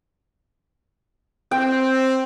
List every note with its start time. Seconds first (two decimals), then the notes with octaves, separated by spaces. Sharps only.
1.51 C4 G5